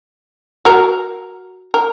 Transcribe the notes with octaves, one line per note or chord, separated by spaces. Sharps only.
F#4 A#4
A#4